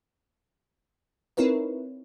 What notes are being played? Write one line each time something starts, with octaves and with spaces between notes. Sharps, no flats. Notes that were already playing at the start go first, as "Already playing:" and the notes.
C4 D#4 E4 A#4 B4 C#5